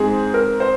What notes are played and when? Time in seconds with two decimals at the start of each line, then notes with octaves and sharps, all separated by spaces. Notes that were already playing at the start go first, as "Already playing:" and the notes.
Already playing: G#2 C4 G#4
0.34 A#4
0.60 C5